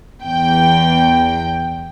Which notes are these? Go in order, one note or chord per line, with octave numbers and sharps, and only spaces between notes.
E2 G5